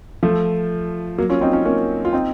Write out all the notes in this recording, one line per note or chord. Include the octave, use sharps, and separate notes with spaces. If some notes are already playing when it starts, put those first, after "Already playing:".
F3 A3
F#3 A#3
C#4 F4
C4 D#4
C#4 F4
A#3 C#4
F4
C4 D#4